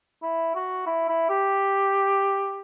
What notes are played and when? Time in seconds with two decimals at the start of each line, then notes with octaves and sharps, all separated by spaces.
0.23 E4
0.55 F#4
0.86 E4
1.09 E4
1.29 G4